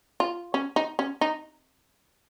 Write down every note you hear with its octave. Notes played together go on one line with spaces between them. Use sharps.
F4
C#4
D#4
C#4
D#4